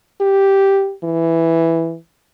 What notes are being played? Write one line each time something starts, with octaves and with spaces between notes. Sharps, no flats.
G4
E3